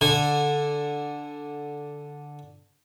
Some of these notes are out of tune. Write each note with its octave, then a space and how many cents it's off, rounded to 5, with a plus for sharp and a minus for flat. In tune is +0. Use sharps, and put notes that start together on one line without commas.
D3 -5 G#5 -25